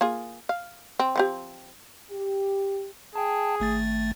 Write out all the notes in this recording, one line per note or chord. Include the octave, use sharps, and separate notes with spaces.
A#3 F4 G#4
F5
C4
F3 C4 G4
G4
G#4 G5 A5
G#1 A3 A6